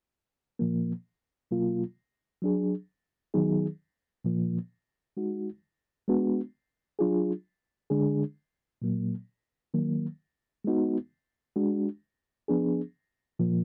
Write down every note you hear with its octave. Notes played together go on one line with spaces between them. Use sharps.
A#2 F3 A#3
B2 F#3 A#3 F4
F#3 D4 G#4
D#3 F#3 B3 D#4 G#4
A#2 F3 A#3
G#3 D#4 F#4
G#3 B3 D4 F#4
F#3 D4 F4 G#4
D3 G#3 D4 G#4
A#2 F#3 A#3
D#3 F#3 A#3
G#3 B3 D#4 F#4
G#3 D4 F#4
F3 B3 D4 G#4
A#2 F3 A#3